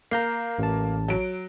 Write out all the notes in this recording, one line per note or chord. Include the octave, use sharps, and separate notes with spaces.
A#3 A#5 G6 C7
A1 A5
F#3 D7